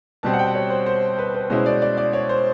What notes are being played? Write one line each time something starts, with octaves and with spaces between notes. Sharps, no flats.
B2 G3 C4 A5
F#5
G5
C#5
C5
C5
B4
B4
B2 G#3 C#4 E4 C5
D5
D5
D5
C#5
C5